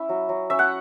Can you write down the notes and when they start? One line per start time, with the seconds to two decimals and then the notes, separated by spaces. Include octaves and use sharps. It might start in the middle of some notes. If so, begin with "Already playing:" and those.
Already playing: C#4 E4 E5
0.09 F#3
0.29 F#3
0.50 C#4 E5
0.59 F#5